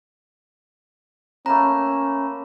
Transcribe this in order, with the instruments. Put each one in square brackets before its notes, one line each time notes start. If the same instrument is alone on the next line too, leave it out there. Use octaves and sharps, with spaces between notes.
[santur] A3 A#3 B4 [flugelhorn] C#4 [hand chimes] A#5